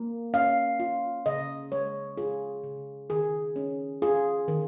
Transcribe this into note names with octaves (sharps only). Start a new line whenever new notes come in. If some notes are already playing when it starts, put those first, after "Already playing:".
Already playing: A#3
C#4 F5
F4
C#3 D#5
G#3 C#5
F4 G#4
C#3
D#3 G#4
C#4
F4 G#4
D#3